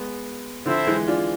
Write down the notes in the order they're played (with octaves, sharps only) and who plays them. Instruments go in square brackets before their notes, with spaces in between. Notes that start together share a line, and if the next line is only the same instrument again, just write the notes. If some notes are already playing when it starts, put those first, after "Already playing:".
Already playing: [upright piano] G#3 B3
[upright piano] D3 F3 [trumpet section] C4 E4 A4 C5 E5
[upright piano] E3 G#3
D4 F4